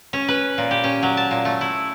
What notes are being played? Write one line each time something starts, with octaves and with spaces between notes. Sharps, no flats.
C#4
B4
A#2
G4
C#4
F#3
A5
A#2
A3
E4